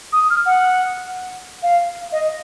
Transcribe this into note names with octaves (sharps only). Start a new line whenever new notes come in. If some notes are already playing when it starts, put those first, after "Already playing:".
D#6
F6
F#5
F5
D#5